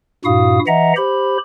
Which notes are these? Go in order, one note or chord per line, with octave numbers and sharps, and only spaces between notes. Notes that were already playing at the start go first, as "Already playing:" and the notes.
G2 A#2 E4 F#4 F5 D#6
E3 D#5 E5 F#5 A#5
G4 C5 B5